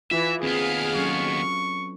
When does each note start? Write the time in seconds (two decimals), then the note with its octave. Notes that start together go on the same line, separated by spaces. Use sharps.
0.11 E3 F4 E5
0.43 D#2 B3 C4 G#4 B4 F5
0.96 F#3 C#4 A4 C#6